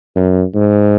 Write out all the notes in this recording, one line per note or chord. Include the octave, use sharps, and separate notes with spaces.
F#2
G#2